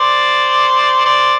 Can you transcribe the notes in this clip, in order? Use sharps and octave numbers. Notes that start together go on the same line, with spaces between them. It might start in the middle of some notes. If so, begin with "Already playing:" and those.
Already playing: C5 D5
C5 D5